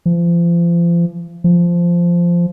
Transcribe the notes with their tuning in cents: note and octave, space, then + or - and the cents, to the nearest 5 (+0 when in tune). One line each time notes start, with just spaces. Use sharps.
F3 -35
F3 -10